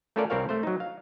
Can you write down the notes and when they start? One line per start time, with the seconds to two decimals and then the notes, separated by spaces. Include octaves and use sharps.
0.16 A3 C#4 F4 A4 A#4 D5
0.30 C2 C4 G4 A#4 C#5 F5
0.49 A3 C5
0.63 F#3 D#4
0.80 F5